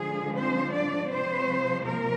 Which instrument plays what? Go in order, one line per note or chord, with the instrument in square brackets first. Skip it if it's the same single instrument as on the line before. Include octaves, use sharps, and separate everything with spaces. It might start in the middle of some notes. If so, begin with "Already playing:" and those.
Already playing: [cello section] D3 F3 G#3 G#4
C4 C5
D4 D5
C3 F3 G#3 C4 C5
A#3 A#4